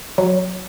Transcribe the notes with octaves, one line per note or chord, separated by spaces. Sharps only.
F#3